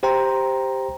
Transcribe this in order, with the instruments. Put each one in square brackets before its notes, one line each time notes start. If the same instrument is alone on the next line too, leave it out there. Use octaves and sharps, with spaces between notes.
[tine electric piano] G4 C5 G5 A#5 C6